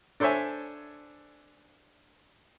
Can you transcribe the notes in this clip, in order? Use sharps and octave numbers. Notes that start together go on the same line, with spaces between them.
D4 A4 C5 C#5 E5 G#5